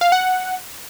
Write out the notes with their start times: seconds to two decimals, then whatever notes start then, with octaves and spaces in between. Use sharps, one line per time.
0.01 F5
0.12 F#5